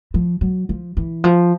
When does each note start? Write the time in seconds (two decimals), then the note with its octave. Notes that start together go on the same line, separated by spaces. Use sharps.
0.14 F3
0.41 F#3
0.69 F3
0.97 E3
1.24 F3